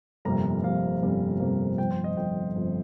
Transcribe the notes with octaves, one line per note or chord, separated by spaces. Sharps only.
G1 F2 C3 G3 A#3 A#5
G1 F2 C3 G3 A#3 F5
G1 F2 C3 G3 A#3
G1 F2 C3 G3 A#3
G1 F2 F3 G5
C5
D#5
G1 F2 F3 G5
G1 F2 F3